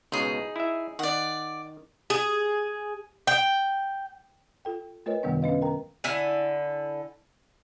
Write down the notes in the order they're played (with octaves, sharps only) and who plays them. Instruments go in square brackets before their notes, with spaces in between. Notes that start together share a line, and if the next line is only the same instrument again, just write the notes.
[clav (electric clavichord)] C#2 B2 [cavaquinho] D#4 G#4
[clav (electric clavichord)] E4 E5
[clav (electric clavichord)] D#3 [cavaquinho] D5 F#5
[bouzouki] G#4
G5
[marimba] F4 A4 G5
A3 F4 A#4 B4 C#5 D#5
F#2 C3 D#3 G3 B3 D4
C#4 D4 B4 D#5 F5
A#4 G5 A#5
[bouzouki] D3 E4 G#5